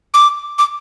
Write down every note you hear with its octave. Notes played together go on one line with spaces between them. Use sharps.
D6
D6